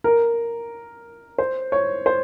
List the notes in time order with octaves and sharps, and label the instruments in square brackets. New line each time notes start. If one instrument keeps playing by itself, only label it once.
[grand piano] A#4
C5
C#5
C5